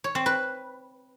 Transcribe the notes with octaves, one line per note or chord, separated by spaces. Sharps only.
C#5
C4
B4